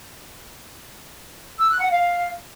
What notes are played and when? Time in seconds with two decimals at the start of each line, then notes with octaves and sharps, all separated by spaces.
1.58 E6
1.69 F#6
1.80 F#5
1.90 F5